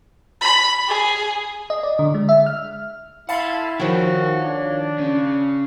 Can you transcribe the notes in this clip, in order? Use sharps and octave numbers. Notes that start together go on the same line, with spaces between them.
B5
G#4
D#5
D5
D3
G#3
E5
F6
E4 F5 F#5 A5 B5 C6
D#3 F3 F#4 C#5 F5
D4
C#3 C#4